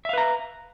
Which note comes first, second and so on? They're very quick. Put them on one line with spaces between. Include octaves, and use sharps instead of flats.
E5 F5 B4 A#5